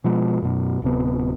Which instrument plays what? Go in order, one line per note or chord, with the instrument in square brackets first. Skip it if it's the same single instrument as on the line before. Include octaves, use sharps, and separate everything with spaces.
[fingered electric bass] B2 F3 G#3
F#2 B2
D1 C3 B3